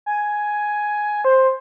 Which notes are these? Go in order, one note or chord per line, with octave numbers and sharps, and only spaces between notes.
G#5
C5